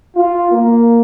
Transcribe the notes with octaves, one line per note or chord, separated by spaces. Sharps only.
F4
A#3